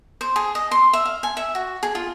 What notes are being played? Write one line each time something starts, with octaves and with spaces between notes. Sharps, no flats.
C5
G#4
D#5
C6
E5
F5
G#5
E5
F#4
G#4
F4